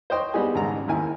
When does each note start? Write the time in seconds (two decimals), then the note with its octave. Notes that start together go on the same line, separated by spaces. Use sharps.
0.10 C5 C#5 D#5 G5 C6
0.34 G3 B3 D#4 G4 G#4
0.55 G#1 G#2 C#3 A#5
0.88 D#2 D#3 E4 A#4 G#5